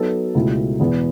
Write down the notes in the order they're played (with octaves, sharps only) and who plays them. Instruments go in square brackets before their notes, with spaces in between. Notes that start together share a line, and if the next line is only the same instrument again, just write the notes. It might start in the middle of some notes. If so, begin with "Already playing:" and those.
Already playing: [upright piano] F#3 B3 D#4 A4
C#2 B2 A3 E4
E2 B2 G#3 B3 E4